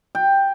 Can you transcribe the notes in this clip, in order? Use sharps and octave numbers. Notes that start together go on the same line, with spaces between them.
G5